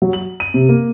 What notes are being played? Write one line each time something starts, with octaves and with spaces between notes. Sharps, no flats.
F#3
F#7
D#7
C3
A#3